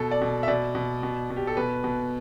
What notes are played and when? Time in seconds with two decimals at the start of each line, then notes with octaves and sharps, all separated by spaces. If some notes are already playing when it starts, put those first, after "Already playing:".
Already playing: B2 A4
0.11 D5
0.21 B2
0.43 E5
0.48 B2 D5
0.75 B2
1.03 B2
1.30 B2
1.36 G4
1.47 A4
1.57 B2 B4
1.84 B2